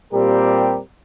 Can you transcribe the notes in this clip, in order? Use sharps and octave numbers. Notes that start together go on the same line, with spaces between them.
A#2 G3 C4 G4 A#4